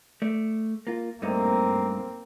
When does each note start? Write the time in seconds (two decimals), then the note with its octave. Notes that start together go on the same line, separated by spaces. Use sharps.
0.22 A3 D5
0.87 A#3 F4
1.22 G2 A3 A#3 C4 D#4